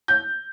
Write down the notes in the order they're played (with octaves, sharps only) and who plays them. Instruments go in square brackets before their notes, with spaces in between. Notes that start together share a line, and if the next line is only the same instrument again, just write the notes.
[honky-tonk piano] G6